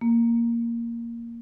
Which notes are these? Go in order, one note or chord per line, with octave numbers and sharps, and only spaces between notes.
A#3